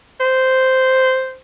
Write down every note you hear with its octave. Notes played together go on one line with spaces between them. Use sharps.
C5